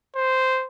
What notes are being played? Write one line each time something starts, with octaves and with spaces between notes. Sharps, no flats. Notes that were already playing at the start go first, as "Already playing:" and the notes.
C5